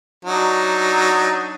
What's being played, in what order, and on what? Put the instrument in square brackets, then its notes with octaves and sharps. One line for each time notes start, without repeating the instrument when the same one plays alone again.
[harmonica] F#3 D4 D#4